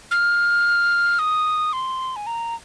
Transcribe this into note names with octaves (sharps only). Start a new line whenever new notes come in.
F6
D#6
C6
G#5
A#5